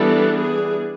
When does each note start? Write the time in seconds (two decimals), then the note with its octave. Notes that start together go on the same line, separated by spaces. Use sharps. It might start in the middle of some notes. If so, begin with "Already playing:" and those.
Already playing: E3 G3 B3 D4 A4
0.35 G#4